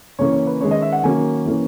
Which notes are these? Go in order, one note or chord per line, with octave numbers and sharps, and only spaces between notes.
C#3 E3 A#3 C#4 C#5
C#5
B4
D#3 G#3 C#4 C#5
D#5
E5
F#5
D#3 F#3 A#3 C#4 G#5
E3 A#3 C#4